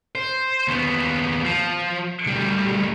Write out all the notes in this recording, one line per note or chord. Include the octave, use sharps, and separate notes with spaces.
C5
D#2 B3
F3
D2 G3